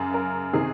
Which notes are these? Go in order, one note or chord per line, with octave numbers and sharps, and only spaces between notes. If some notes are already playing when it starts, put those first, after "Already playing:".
Already playing: F#2 C#3 A#4
A#4
C3 D#3 G#4